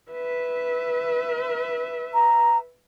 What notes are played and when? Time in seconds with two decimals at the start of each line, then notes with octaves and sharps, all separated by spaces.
0.11 B4 E5
2.14 A#5